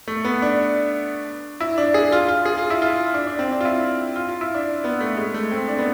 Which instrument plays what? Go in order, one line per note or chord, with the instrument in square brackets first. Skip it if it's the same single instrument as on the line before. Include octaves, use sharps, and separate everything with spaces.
[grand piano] A3
B3
D4
E4
D4
G#4
F4
F4
G#4
F4
E4
F4
D4
D4
C4
D4
F4
E4
F4
F4
E4
D4
B3
A3
G#3
A3
C4
D4
B3